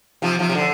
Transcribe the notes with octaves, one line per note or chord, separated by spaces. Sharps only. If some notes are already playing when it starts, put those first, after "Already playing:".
C3 F3
C3 F3
C3
D3